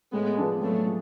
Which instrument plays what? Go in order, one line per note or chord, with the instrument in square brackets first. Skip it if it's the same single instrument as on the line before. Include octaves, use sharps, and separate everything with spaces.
[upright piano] A2 [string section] G#3 B3
[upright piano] F3 B3 D4 G#4
[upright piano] A2 [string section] F#3 A3
[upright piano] F3